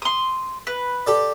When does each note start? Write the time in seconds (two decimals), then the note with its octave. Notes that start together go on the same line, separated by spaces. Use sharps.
0.02 C6 D#6
0.67 B4
1.06 G4 A4 D5